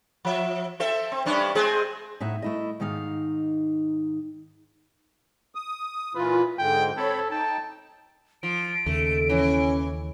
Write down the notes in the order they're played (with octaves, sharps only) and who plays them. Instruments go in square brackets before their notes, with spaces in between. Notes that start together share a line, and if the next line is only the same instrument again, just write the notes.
[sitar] F3 E5
C4 A4 E5
C4
G2 C#4 D4
G#3 C4 G#4
[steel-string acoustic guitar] A2 D#4 E5 F#5
A3 E4 D#5
G#2 D#3 D#4 F5
[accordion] D#6
[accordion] A#2 E3 F4 [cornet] B4
[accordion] G#2 D3 G#3 [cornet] G5
[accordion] C4 C#5 B5 [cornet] A4
[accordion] D#4 G5 [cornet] A5
[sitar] F3 [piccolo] D7
[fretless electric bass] D#2 C#3 [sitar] A3
[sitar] E3 [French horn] C#4